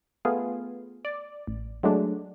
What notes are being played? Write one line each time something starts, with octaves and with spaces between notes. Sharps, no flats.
A3 B3 F4 G#4
D5
A1
F#3 G#3 A3 D4